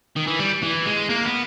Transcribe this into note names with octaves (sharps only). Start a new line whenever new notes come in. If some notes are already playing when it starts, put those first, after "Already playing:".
D#3
E3
G3
E3
G#3
A#3
B3